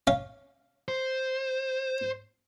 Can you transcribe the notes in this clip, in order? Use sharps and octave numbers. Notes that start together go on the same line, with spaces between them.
C#4 F5
C5